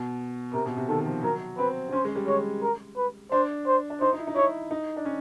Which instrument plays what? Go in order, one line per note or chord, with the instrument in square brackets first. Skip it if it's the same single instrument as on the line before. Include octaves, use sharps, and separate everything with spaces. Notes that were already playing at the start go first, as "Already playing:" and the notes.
Already playing: [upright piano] B2
[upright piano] C3 [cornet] A#4
[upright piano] B2
C3
[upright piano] D#3 [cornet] A4
[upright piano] F3
[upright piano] F#3 [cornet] A#4
[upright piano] C4 [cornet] B4
[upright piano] C4
[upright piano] C#4 [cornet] C5
[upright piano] G#3
G3
[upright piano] G#3 [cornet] C#5
[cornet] A#4
B4
[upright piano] D4 [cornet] C5
[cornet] C5
[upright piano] D4
[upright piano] D#4 [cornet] C5
[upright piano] D#4
E4
D#4
[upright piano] E4 [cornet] C#5
[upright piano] D#4
D4
C#4